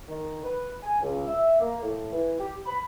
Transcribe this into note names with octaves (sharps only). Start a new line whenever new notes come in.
D#3
B4
G#5
C#2
E5
A#3
A2
E3
G4
B5